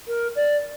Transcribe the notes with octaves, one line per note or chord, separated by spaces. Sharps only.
A#4
D5